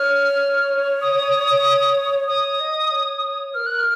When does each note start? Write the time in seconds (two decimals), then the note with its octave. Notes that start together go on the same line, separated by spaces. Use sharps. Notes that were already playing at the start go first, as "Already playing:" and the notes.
Already playing: C#5 F6
1.01 D#6
2.27 C#5 D#6
2.60 D#5
2.91 C#5
3.54 A#4 F6
3.66 F#6
3.79 F6